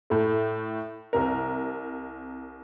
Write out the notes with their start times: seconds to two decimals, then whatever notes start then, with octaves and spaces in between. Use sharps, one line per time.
0.10 A2 A3
1.13 C2 C3 A#4